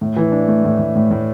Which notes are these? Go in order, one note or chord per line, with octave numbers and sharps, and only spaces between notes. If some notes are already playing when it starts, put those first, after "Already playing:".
A2
E3
D4
A3
A2
A2
A2
A2